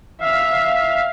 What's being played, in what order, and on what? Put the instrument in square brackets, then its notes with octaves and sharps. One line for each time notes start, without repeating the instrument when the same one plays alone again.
[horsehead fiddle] E5 [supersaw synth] F5